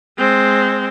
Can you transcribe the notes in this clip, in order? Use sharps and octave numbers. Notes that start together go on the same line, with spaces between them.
G#3 C4